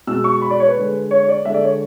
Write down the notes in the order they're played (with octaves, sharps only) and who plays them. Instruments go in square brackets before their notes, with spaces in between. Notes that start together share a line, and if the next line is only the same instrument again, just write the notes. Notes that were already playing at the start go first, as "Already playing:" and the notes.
[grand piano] B2 G#3 E6
C#6
B5
D5
C#5
B4
D3 G#3
C#5
C#5
D5
D3 G#3 E5
D5
C#5